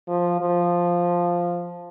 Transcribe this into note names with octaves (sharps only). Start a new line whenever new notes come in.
F3
F3